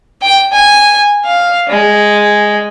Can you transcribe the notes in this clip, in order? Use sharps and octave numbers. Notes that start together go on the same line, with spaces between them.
G5
G#5
F5
G#3